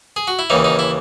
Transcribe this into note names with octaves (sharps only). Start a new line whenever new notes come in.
G#4
F#4
E4
D#2 C#3 E3 D#4
D#4
E4